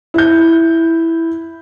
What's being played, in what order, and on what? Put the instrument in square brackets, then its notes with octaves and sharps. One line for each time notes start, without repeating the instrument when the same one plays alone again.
[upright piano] E4 G6